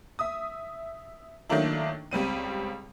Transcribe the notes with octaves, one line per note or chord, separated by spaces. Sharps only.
E5 D#6
D#3 F#3 A3 A#3 D4 E4
C#2 G3 C4 D#7